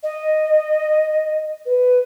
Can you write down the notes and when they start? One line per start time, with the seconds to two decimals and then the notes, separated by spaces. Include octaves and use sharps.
0.03 D#5
1.66 B4